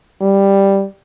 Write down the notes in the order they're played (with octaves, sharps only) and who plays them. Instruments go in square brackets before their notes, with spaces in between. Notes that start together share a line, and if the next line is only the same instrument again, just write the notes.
[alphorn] G3